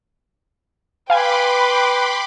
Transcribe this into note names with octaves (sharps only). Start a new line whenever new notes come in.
B4 F5 G5 G#5 B5 C6 D6 G#6